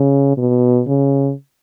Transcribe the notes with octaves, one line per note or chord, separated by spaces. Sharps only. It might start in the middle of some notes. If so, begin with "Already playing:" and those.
Already playing: C#3
B2
C#3